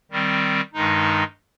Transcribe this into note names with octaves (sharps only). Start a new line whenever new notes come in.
D#3 G3 C4
G2 D#3 G#3 D#4